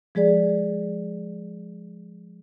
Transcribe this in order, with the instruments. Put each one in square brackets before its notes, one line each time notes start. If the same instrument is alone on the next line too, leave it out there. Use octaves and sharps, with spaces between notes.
[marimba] F3 G#3 G#4 D5